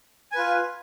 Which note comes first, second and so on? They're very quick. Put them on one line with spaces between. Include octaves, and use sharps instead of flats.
G#5 B4 F4